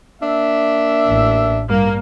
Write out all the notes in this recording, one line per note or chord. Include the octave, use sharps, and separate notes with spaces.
A#3 D4 E5
A1
G2 A#3